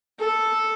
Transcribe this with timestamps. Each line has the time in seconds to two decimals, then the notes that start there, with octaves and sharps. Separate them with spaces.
0.20 A4